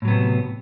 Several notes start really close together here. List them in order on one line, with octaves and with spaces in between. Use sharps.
A2 F#3 B3 C3